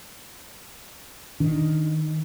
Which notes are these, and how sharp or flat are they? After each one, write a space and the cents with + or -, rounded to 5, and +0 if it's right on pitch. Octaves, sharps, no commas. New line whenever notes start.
D#3 +0 D4 +0